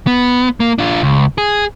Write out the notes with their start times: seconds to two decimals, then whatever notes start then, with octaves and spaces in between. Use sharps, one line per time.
0.07 B3
0.60 A#3
0.78 D4 F4
1.03 C#2
1.38 G#4